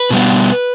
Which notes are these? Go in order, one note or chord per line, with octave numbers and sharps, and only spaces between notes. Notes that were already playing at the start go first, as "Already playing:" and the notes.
Already playing: B4
B2 G3 B3